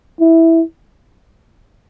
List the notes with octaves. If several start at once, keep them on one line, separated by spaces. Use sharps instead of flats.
E4